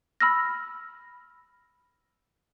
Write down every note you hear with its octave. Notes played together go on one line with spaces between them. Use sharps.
B5 E6 F6 A#6